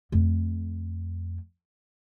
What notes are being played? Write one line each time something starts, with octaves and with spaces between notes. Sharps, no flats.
F2 A3